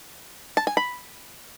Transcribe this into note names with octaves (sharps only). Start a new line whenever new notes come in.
A5
G#5
B5